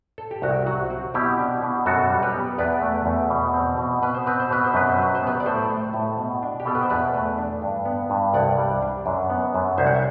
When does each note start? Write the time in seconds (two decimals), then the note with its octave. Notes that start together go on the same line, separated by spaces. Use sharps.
0.18 A4
0.31 G4
0.42 C2 F#4
0.66 F#3 F#4
0.90 C4 F#4
1.14 B2 E4 G4
1.38 D4
1.62 B2
1.86 F#2 F#4 A4
2.10 G3
2.23 G4 B4
2.34 B3
2.58 E2 B4 D5
2.82 A3
3.06 E2
3.30 B2
3.54 C4
3.78 B2
4.02 B2 B4
4.15 C5
4.26 C4 B4
4.40 C5
4.50 B2 B4
4.64 C5
4.74 F#2 B4
4.90 C5
4.98 F#3 B4
5.15 C5
5.22 B3 G4 B4
5.40 D5
5.46 A2 A4 C5
5.70 A3
5.94 A2
6.18 B2
6.43 D4
6.60 G4
6.65 B2 A4
6.75 B4
6.83 C5
6.90 E2 B4 D5
7.14 A3
7.38 D4
7.62 G2
7.85 B3
8.10 G2
8.34 C2 D5 F#5
8.58 G3
8.82 D4
9.06 F#2
9.30 B3
9.54 F#2
9.78 C2 C5 E5
9.87 F#5
9.94 E5